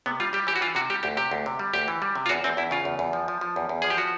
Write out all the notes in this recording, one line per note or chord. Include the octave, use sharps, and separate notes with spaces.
C3 B3
G3 F4
G3 G4
E3 G4
F#4
E3 F4
C3 F#4
G3 G4
D2 G4
C3 G4
D2
C3
G3
D2 G4
E3
G3
C3
F4
E2 F#4
E2 C4
E2 E4
C#3 F4
E2
E2
F3
F3
F3
E2
E2
F3 G#4
G4
F3 F#4